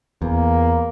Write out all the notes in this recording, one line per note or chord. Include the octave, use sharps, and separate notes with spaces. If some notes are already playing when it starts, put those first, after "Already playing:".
E2 A#3